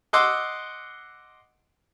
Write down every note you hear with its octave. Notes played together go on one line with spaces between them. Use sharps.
D#5 F#5 C6 D6 E6